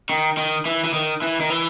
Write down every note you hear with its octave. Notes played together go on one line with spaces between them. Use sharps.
D#3
D#3
E3
E3
D#3
E3
D#3
E3